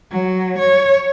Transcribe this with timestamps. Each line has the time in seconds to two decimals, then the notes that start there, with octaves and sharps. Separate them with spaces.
0.11 F#3
0.59 C#5